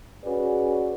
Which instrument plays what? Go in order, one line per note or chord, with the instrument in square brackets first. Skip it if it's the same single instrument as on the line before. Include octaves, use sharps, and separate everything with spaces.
[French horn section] C#4 F#4 G#4 B4 D5